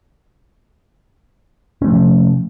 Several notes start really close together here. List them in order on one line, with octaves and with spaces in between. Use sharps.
C#4 A3 F3 C3